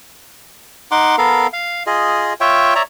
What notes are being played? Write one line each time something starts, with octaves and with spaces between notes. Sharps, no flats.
D#4 F#5 C6 D6
B3 A4 A#4 F5
F5
F4 G#4 D#5
F4 C#5 E5 G5
C#5 D5 E5 A#5